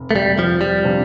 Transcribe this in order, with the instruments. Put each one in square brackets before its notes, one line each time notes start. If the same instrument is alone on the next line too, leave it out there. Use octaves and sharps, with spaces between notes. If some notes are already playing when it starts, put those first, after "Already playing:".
Already playing: [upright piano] F1
[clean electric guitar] A3
G3
F3
G3
[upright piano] C3 F3 D4